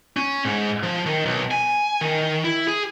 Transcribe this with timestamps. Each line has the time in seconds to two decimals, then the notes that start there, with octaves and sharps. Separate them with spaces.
0.17 C#4
0.45 G#2
0.83 F3
1.06 D#3
1.25 B1
1.51 G#5
2.01 D#3
2.44 E4
2.67 G#4